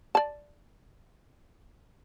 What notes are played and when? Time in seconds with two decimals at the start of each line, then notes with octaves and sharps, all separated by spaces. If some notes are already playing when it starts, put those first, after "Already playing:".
0.15 D5 A5